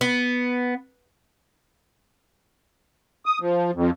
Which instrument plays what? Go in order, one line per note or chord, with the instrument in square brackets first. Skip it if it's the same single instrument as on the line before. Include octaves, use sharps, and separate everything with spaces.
[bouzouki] B3
[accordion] D#6
F3
F2